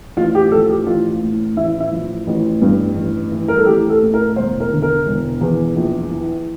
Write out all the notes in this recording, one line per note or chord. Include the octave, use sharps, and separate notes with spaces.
A1 F4
G4
F3 A4
G4
A1 F4
A2
A1 E4
E4
F3
A1
G2
A1
E3
A#4
A4
A1 G4
A4
A2
A#4
E1 C5
A#4
D3
A#4
E1
E2
A#1
E3